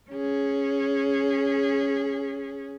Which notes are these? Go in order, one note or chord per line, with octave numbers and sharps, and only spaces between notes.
C#4 G#4